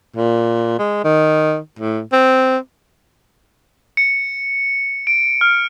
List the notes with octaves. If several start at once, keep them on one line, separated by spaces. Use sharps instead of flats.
A#2
G#3
D#3
A2
C4
C#7
D7
F6